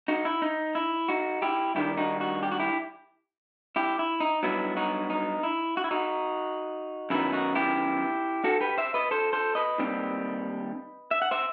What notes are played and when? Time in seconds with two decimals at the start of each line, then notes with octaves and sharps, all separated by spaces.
0.08 D#4 F#4
0.25 E4
0.42 D#4
0.75 E4
1.08 D#4 F#4
1.42 E4 G4
1.75 G2 D#3 G3 E4 G4
1.97 D#4 F#4
2.20 D#4 F#4
2.43 G4
2.52 F#4
2.59 E4 G4
3.76 E4 G4
3.99 E4
4.20 D#4
4.43 G2 F#3 B3 D#4 E4
4.77 D#4 F#4
5.10 D#4
5.43 E4
5.77 F#4
5.84 E4
5.91 D#4 F#4
7.10 F#2 D#3 F#3 B3 D#4 E4
7.32 D#4 F#4
7.55 E4 G4
8.44 F#4 A4
8.61 G4 B4
8.78 C5 E5
8.94 B4 D#5
9.11 A4 C5
9.33 A4 C5
9.55 B4 D#5
9.78 D#2 D#3 G3 C4
11.11 E5
11.22 F#5
11.31 C5 E5